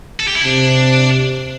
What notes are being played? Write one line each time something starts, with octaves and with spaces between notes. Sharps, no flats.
A4
G4
E4
C3 D4